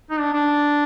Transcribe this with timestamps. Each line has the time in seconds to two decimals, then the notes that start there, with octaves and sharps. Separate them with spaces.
0.10 D#4
0.19 D4
0.33 D4